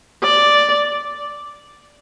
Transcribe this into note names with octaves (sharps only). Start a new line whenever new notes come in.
D5